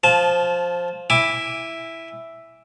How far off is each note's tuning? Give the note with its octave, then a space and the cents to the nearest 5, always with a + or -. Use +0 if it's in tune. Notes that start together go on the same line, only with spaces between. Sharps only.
F3 +5 A5 -25
E4 +0 G#5 -25 D6 +0